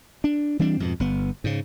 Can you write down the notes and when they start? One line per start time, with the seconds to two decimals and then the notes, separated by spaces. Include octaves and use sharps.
0.24 D4
0.59 E3 G3 C4 D4
0.80 F2 G#2 B2
1.00 G1 B3
1.44 G#2 C#3